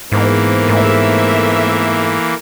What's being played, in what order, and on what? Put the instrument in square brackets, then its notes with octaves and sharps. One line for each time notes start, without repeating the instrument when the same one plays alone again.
[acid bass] G#2 [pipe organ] E3 A#3 [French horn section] B3 A#4 C5
[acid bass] G#2 [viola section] A3 E5